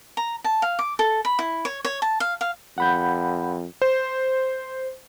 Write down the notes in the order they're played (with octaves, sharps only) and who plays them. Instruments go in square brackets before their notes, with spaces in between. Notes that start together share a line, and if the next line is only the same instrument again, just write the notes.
[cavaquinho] A#5
A5
F5
D6
A4
B5
E4
C#5
C#5
A5
F5
F5
[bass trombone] F2 [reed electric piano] F#5 B5 G6
[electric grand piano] C5